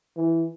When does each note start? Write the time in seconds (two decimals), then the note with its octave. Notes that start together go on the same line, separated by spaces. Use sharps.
0.17 E3